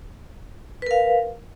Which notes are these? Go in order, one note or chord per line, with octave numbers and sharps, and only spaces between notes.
A#4 B4 F5